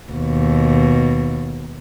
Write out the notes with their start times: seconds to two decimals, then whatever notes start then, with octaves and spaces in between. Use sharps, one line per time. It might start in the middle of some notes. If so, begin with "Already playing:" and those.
0.12 D#2 B2